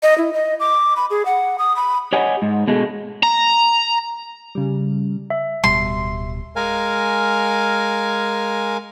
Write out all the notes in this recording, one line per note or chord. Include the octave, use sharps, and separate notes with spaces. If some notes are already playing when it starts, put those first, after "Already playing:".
D#5
E4
D#5
D6
B5
G#4
F#5
D#6
B5
G4 C#5 D#5 F#5 G#5
G#2
B2 G#3 A3
A#5
C#3 G3
E5
D1 B2 G3 C6
G#3 A#4 F5 G#5